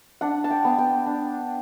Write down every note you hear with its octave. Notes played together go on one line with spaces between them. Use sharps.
D4 F#5
A5
G5
B3
G5
D4